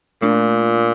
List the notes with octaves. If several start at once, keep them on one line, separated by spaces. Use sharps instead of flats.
A#2 A3 D4 F4